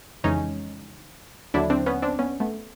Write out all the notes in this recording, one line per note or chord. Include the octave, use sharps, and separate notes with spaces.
F2 C#3 E3 G#3 C#4 D#4
D#2 D3 F#3 D4 E4
C4 D4
B3 C#4
C4 D4
B3 C#4
A3 B3